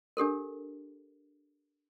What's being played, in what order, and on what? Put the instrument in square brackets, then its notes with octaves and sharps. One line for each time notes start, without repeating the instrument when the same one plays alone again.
[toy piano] D4 G4 A4 A#4